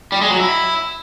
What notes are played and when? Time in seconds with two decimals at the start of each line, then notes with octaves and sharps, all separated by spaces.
0.12 G3
0.21 G#3
0.31 F#3
0.40 E4